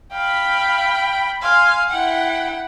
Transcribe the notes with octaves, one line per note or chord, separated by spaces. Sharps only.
F5 G5 B5
F5 G#5 C6
E4 F#5 G5